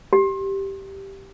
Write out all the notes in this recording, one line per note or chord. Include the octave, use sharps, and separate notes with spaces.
G4